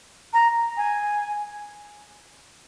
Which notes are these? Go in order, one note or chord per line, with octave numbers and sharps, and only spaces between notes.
A#5
G#5